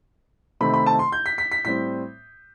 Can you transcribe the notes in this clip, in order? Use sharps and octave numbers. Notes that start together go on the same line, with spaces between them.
C3 D#3 A3 C4 B5
B5
A5
C6
G6
B6
B6
B6
A2 G3 C4 B6